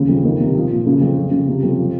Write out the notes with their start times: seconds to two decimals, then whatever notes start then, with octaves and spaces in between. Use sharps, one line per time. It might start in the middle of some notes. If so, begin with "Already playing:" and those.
Already playing: D#2 C#3
0.08 F2
0.23 D#3
0.40 C3
0.55 F3
0.70 A#2
0.86 C#3
1.01 F2
1.17 F3
1.31 C#3
1.48 C3
1.63 F2
1.78 F3